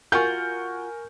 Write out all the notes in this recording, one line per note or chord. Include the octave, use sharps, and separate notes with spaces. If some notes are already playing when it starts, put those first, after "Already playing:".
F4 F#4 A#4 F#5 G#5 C#6 G6